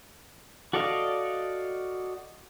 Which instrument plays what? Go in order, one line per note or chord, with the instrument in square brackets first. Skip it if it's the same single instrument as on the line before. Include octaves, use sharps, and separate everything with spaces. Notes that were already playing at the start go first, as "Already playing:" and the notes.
[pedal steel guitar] F#4 A4 D5 D#5 F5